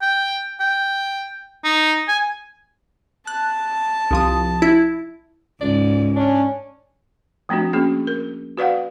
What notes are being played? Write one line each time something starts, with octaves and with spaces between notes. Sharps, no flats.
G5
G5
D#4
G#5
A5 F#6
C2 F3 D#6
E4
C#2 G#2 D5
C#4 D4
F3 A3 C4 D4 F#4
A#3 C#4 F#4 G#4
A#4
F#4 B4 D5 F5 F#5